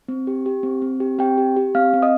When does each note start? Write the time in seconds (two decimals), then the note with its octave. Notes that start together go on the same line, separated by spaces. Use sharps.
0.08 C4
0.27 G4
0.46 G4
0.63 C4
0.82 C4
1.00 G4
1.19 C4 G4 G5
1.38 G4
1.57 G4
1.75 C4 F5 F6
1.94 C4
2.02 D#5 D#6